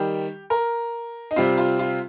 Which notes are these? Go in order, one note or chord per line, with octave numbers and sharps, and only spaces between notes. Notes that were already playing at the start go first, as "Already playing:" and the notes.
Already playing: D#3 G3 G4
A#4
D#4
C3 G3 C4 F4
F4
F4